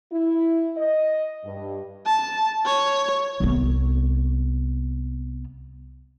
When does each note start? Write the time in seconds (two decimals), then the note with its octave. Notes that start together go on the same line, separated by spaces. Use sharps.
0.11 E4
0.76 D#5
1.44 G2
2.06 A5
2.66 C#5
3.40 C2 B3